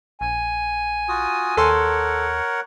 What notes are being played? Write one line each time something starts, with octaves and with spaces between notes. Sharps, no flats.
A#1 G#5
F4 F#4 D#6
D#2 A4 A#4 C#5 F#5 C6